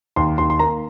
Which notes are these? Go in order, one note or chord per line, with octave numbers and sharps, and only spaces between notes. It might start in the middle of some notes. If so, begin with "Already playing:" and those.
D#2 C6
D#2 C6
C6
A#3 A#5